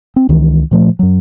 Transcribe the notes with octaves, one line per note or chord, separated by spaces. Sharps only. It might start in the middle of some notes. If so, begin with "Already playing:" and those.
C4
C#2 D#3 E3
A#2 F3 A3
F#2 F#3